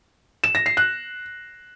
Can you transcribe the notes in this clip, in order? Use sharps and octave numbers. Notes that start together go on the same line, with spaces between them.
E7
A#6
C7
F#6